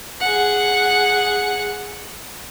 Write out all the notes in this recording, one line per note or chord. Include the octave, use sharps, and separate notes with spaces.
G#4 F#5